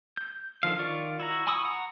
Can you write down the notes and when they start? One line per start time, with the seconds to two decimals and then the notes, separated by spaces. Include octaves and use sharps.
0.17 G6
0.63 D3 D#3 F3 F5
0.79 D#3 F4 D5 C#6
1.20 E4 F#4 A#5
1.47 G#5 B5 C#6 D#6 E6
1.65 F#5 A#5